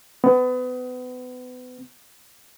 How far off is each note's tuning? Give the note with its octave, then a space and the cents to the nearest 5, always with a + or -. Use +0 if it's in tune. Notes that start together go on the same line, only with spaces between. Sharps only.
B3 +30